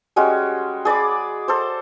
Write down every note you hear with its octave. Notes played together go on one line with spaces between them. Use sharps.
G3 G#3 C#4 F#4
G#4 D5 B5 D6
A4 C5